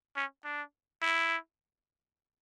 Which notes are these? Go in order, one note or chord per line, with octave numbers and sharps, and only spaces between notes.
C#4
D4
E4